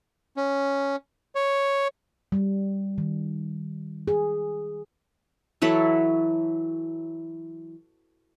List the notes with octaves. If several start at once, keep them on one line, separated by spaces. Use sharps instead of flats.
C#4
C#5
G3
D#3
G#4
E3 F#3 E4 A4